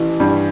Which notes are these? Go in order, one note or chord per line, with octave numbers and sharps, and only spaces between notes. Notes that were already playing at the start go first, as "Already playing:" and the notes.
Already playing: A1 E3
G2